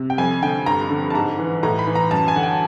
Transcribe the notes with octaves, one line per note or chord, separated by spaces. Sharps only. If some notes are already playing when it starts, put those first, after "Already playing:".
Already playing: C3
G5
F2 G#5
D3 G5
G2 A#5
D3
A5
G#2 A#5
E3
A2 A#5
B5
E3
A#5
F#2 A5
G#5
D3 F#5
G5